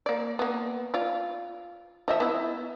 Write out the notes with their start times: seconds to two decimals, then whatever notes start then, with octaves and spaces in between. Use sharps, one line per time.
0.06 A#3 D5
0.39 A#3 B3
0.94 F4 D5
2.08 F3 D#5 E5
2.20 B3 E4